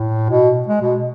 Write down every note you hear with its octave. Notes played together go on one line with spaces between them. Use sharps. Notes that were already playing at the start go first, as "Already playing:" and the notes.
Already playing: A2
B2
G#3
B2